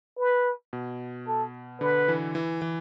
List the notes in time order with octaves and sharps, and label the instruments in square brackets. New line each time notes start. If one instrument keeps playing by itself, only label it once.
[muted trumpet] B4
[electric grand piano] B2
[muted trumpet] A4
[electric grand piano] D3 [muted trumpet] B4
[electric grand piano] E3
E3
E3